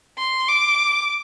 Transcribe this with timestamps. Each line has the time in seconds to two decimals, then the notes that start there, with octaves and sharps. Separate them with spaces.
0.18 C6
0.48 D6